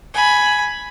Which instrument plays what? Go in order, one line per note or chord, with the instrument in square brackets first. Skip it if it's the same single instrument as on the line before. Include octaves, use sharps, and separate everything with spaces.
[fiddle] G#5 B5